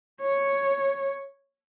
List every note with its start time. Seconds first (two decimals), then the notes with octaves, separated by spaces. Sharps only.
0.21 C#5